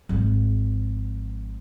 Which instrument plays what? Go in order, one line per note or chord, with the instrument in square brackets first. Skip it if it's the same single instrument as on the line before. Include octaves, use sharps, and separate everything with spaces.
[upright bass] G#1 F3